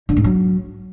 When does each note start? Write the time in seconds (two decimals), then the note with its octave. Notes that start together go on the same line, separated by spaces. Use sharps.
0.09 D3
0.17 G#2
0.24 F#3